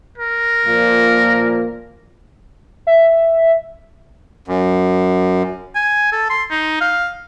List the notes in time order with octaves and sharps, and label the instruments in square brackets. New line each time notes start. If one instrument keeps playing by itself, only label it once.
[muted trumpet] A#4
[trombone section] A#2 F3 A#3
[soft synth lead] E5
[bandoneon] F#2
[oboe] G#5
A4
C6
D#4
F5